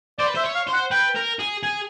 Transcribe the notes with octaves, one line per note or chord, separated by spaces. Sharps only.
C5 D5
B4
C5 E5
C#5
F5
C5
F#5
B4 G5
A#4
G#4
G#4 G#5